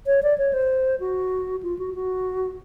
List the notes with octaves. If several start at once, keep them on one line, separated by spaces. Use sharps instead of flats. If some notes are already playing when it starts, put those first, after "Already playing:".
C#5
D5
C#5
C5
F#4
F4
F#4
F#4